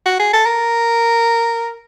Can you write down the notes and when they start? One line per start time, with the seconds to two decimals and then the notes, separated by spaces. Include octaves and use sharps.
0.06 F#4
0.20 G#4
0.33 A4
0.46 A#4